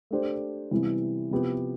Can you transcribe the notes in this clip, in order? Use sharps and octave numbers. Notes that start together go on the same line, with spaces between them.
A3 D4 G4 C5
C3 E3 G3 B3 E4
C3 F3 B3 E4 G4